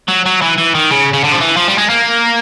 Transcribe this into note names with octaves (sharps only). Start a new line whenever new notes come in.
F#3
F#3
E3
E3
D#3
C#3
C#3
D3
F3
E3
F3
G3
G#3
A#3